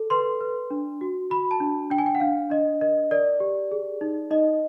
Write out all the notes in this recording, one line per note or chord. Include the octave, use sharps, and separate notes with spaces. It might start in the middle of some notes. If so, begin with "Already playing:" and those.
Already playing: A4
B4 C6
B4
D4
F#4
F#4 B5
A5
D4
D4 G5
G#5
G5
F#5
D4 F5
D4 D#5
A#4 D#5
A#4 D5
G4
G#4
D#4
D#4 D#5